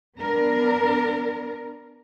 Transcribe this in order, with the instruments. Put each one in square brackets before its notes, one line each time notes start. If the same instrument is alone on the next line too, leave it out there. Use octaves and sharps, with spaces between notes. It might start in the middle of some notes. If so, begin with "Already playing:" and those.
[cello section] B3 D4 A#4